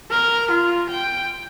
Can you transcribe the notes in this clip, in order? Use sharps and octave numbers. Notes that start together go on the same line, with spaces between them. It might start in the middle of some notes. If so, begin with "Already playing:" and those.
A#4
F4
G5